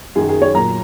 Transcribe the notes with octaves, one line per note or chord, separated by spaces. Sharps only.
F#2 D#3 F#3 G#4
G#4
C#5
A#2 F#3 A#5